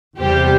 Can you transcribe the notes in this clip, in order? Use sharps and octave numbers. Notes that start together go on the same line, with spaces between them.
E2 C3 G3 G4 C5